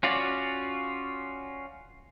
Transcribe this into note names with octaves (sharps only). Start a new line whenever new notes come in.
C#4 F4 F#4 D5